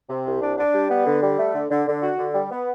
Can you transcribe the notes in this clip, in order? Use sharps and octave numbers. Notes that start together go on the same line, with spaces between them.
C3
C2
D4
D4
G3
B3
D3
G3
A3
D3
D3
D3
F#4
D3
G3
B3